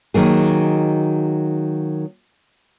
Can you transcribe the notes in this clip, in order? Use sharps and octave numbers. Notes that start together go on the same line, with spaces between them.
D#3 F#3 A#3 G#4